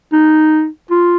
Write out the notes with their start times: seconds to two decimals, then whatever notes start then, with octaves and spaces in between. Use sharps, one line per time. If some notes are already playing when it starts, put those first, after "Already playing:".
0.13 D#4
0.91 F4